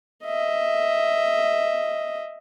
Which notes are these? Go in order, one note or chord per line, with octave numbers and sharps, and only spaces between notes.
D#5 E5